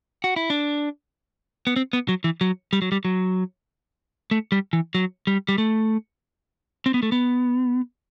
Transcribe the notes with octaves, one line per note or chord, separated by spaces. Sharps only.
F#4
E4
D4
B3
C4
B3
F#3
E3
F#3
G3
F#3
G3
F#3
A3
G3
E3
F#3
G3
G3
A3
C4
B3
A3
B3